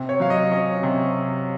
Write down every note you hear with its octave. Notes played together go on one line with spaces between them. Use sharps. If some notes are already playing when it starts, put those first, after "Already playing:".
Already playing: C3
C#5
F#3 F5
D#5
C#4 D#5
C3